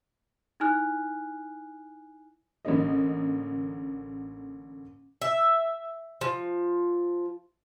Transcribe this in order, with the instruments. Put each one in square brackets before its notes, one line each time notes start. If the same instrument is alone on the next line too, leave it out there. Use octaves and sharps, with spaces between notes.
[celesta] D#4 E4 G#5 F6 F#6
[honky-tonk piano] A1 D3 A#3 D#5
[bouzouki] E5
F3